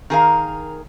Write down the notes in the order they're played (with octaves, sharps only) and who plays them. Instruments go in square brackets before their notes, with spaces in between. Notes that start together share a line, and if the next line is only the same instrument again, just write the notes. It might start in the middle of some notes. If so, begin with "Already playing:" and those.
[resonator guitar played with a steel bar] D#3 G#4 A#4 F5